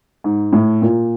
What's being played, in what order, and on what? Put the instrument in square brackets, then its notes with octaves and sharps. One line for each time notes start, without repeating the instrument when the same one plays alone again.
[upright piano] G#2
A2
A#2